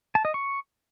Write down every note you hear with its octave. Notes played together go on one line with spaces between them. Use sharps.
A5
D#5
C#6